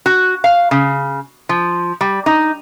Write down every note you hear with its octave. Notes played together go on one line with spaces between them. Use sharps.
F#4
F5
C#3
F3
G3
D#4